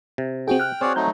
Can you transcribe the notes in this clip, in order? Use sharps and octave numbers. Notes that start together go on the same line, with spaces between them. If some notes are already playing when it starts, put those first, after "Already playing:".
C3
C4 F#4 G#4 G5
F6 F#6
C4 F#4 G#4 C#5 D5
F#3 A3 D#4 G6